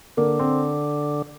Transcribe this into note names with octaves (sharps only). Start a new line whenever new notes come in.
D3 A#3
C4